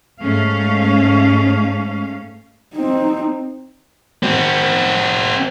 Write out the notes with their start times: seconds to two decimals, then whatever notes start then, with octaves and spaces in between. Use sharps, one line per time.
0.21 G#2 A3 C#4 F5
2.75 C4 D#4
4.23 C4 F#4